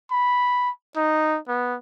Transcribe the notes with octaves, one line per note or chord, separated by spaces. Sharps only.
B5
D#4
B3